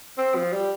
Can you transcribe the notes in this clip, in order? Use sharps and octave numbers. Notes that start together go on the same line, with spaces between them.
C4
F3
G3